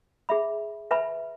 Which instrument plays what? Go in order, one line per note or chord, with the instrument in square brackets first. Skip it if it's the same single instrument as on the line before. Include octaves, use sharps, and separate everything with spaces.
[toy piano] G#4 E5 B5
B4 E5 G#5 B5